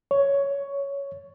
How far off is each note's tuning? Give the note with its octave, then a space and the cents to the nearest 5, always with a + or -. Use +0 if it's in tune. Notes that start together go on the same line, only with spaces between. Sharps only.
C#5 +10